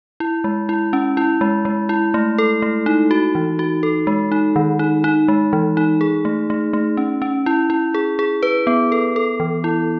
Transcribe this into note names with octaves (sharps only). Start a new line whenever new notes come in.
E4
G#3
E4
C#4
E4
G#3
G#3
E4
A3
A4
A3
D#4
F#4
E3
F#4
A4
G#3
D#4
D#3
D#4
D#4
G#3
E3
D#4
G#4
A3
A3
A3
C#4
C#4
E4
E4
G#4
G#4
B4
B3
A4
A4
E3
E4